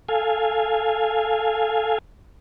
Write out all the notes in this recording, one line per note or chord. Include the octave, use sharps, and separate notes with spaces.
A4 F5 G#5